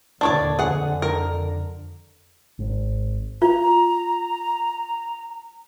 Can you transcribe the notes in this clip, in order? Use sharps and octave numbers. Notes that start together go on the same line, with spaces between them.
D#2 A#2 D3 D4 C#5 D5
F2 D3 G#4 F#5
A#4
G#1
F4 A#5